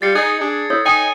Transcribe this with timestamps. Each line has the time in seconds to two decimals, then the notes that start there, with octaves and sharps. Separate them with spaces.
0.02 G3 F4 A6 C7 C#7
0.15 D#4 G#4 G#6 A6
0.41 D4 G#4
0.70 E4 A4 C#5
0.86 D#4 G5 G#5 D#6